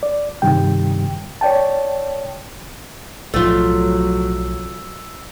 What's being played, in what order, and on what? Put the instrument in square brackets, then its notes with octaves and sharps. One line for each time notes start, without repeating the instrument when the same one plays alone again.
[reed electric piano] D5
G2 C3 D#3 G3 G5
C#5 D5 G5 A5
[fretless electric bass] B1 A2 F3 [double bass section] F#3 [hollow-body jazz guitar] A3 F4 [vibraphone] E6